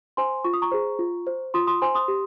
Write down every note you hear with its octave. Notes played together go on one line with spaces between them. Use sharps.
C5 G#5 C6
F4 C#6
D#6
A#5 C#6
G#4 C5
F4
C5
F4 C6 D#6
C6 D#6
C5 G#5 C6
C6 D#6
G4